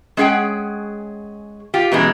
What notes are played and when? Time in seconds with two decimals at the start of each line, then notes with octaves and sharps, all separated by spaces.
0.17 G#3 C#4 G#4 F#5 G5
1.74 F4 G4
1.92 F#2 B2 E3 G#3